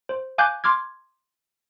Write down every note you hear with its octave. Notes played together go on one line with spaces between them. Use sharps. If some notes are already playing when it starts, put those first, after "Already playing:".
C5
F5 G#5 D6 F#6 G6
C6 D6 F6 G#6